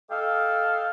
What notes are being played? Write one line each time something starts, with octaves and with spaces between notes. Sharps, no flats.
A4 D#5 F5 G5